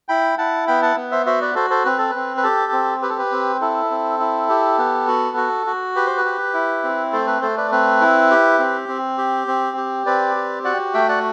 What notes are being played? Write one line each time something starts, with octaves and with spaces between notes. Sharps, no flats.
E4 G5 B5
E4 F#5 A5
B3 G5 B5
F#5 A5
B3
C5 E5
F#4 C5 E5
B4 D5
F#4 A4 C5
A4 C5
C4 B4
A4
C4 B4
B4
G4 A4
C4
G4 B4
A4
B4
C4
E4 A4
C4
E4
G4
B3
F#4
F#4
F#4
G4 B4
C5
B4
G4
E4
C4
A3 A4 C5
B4
A3 A4 C5
B4 D5
C4 B4
E4
G4
C4
C4
G4
C4
G4
C4 B4 D5
G4
F#4 D5 F#5
A3 E5 G5
D5 F#5